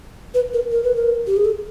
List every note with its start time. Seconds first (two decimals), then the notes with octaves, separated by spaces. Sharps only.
0.34 B4
0.53 A#4
0.71 A#4
0.84 B4
0.96 A#4
1.27 G4
1.36 G#4
1.45 A4